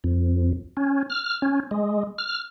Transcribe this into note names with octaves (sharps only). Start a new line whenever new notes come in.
F2
C#4
F6
C#4
G#3
F6